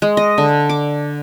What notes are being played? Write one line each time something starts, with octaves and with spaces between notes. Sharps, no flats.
G#3
D#5
D3
D6